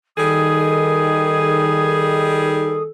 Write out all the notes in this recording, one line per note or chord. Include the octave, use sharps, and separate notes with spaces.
D#3 G3 G#4 A4 D#6